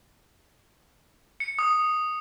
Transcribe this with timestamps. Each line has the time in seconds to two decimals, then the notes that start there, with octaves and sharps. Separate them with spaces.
1.40 C#7
1.59 D#6